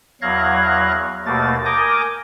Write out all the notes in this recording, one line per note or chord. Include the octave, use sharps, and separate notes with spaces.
E2 F#3 F5 F#6 G#6 A#6
D#2 B2 A3 A#3 A6
A#4 G#5 D6 D#6 G6 A#6